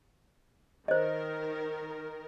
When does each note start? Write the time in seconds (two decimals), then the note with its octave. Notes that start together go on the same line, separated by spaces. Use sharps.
0.88 D#3 A#4 C5 D#5